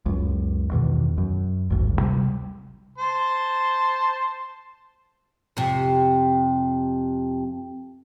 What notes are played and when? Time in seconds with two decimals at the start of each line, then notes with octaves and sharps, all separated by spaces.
0.06 C#2 F#2
0.72 E2 B2 D#3
1.18 F#2
1.70 G#1 D2 G2
1.99 C3 G3
2.98 C5 A5 C6
5.57 F2 C3